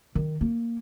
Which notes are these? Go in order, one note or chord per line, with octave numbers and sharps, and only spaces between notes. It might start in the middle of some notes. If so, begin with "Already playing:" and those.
D#3
A#3